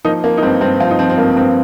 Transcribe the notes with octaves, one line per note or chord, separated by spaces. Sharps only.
F3 A#3 D#4
F3 A#3
D#4
G2 C4
G2 C4
F3 C4 F4
D#4
F3 C4
C4
G2 A#3
G2 C4